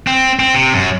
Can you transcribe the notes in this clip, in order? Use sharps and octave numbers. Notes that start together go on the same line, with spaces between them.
C4
C4
C3
F#2